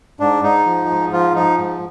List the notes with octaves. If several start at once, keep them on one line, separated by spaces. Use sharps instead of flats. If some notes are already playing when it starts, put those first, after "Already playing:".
G#2 D4
G#2 D#4
F3
G#2
F3 F4
F3 D#4
G#2